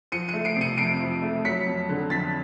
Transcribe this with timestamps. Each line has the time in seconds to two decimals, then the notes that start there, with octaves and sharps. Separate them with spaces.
0.12 F3 C#7 D#7
0.29 A3 C#7 D#7
0.45 C7 D7
0.56 C3 C#7 D#7
0.78 F2 C7 D7
1.01 F3
1.22 A3
1.45 F#3 B6 C#7
1.66 F2
1.89 D3
2.10 F2 A6 B6